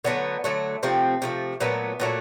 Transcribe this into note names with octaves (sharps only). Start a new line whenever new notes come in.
D3 F#3 A3 B3
D3 F#3 A3
C3 F3 A3 C4
C3 F3 A3
A#2 F#3 A3 B3
A#2 F#3 A3